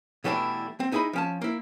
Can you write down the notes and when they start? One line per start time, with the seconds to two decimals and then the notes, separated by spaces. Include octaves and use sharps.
0.24 B2 E3 G3 A3 D4 E4
0.80 C4
0.92 D#4 E4 G#4 D#5 B5
1.13 F3 C#4 A5
1.41 A#3 E4